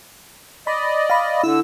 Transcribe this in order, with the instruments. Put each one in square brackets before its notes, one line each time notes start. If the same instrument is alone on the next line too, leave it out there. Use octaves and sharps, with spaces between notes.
[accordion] D5 D#5 [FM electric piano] B5
[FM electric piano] F5 B5
[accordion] D3 E6 [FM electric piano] E4